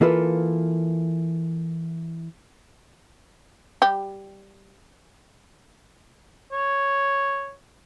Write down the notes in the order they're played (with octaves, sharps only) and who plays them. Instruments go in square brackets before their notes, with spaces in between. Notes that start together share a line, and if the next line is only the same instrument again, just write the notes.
[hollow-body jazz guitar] E3 A#3 F4 A4 B4
[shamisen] G3 G4
[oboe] C#5